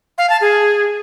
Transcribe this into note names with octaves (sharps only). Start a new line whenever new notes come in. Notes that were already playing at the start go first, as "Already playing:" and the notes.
F5
A5
G#4